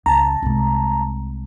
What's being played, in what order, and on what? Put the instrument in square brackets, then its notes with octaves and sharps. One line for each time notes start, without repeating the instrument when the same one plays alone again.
[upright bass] C#2 [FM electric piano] A5 A#5
[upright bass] C2 G#3